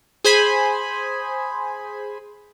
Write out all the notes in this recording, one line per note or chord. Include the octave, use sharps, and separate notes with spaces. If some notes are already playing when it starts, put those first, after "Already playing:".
G#4 C5 G#5 B5